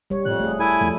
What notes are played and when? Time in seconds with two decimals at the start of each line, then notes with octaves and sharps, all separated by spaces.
0.10 D#1 G3 C#5
0.25 F2 A2 F#6
0.40 D#1 A3 G#4
0.60 E4 A4 G#5
0.81 E2 F3 A3